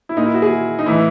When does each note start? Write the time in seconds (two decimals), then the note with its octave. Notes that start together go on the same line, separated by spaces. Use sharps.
0.09 E4
0.17 A#2 D#4
0.25 E4
0.34 F#4
0.42 G#4
0.79 D#4
0.86 A2 E3 E4